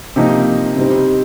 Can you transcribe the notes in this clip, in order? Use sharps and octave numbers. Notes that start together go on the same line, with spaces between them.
C3 F3 A#3 D#4
C3 G3 C4 D#4